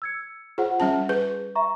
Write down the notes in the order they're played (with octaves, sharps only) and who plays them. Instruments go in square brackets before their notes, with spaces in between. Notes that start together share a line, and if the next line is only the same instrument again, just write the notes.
[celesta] E6 G#6 C#7
[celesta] F4 C5 F#5 [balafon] G#4
[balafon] G3 C#4 A5
[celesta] G#4 [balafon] B4
[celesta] E5 A#5 C#6